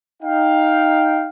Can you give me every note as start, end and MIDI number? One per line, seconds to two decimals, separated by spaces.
0.23 1.29 63
0.23 1.29 77
0.23 1.29 79